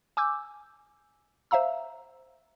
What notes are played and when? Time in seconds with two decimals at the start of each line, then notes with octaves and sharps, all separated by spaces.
0.17 G#5 D6 E6 G6
1.51 C5 E5 F5 A#5 E6